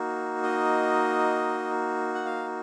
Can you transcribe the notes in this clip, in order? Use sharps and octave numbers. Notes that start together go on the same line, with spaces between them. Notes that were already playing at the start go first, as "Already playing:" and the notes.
Already playing: A#3 D#4 F#4
D#5
F#5
F5